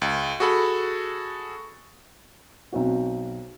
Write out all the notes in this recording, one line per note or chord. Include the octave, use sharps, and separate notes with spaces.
C#2
F#4 G#4 A4 B5
B1 C4 F#4